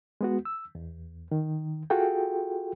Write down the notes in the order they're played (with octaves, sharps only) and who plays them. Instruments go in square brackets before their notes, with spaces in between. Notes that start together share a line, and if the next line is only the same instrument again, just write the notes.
[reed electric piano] G#3 B3 F#4
E6
E2
D#3
F4 F#4 G#4 A4 G5